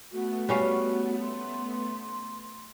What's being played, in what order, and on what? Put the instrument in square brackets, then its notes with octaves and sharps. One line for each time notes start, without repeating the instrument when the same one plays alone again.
[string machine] A3 B3 [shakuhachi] F#4
[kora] G3 C#4 F5
[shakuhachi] C6